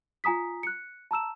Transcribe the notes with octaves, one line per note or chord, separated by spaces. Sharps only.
F4 G#5 A#5 D#6 B6
F#6 C#7
A5 A#5 E6 E7